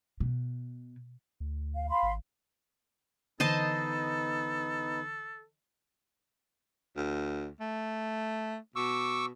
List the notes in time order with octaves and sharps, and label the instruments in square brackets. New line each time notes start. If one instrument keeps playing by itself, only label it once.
[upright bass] B2
[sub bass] D2
[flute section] F5
F5 B5 C6
[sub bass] G#1
[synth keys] D3 E3 [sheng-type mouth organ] B3 D#4 [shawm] A4 [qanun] C5 D#5 A5
[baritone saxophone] D2
A3
[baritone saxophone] B2 [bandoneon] C#6 D6 E6